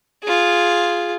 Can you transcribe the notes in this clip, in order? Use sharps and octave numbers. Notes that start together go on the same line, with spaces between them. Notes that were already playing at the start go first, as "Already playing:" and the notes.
F4 G#4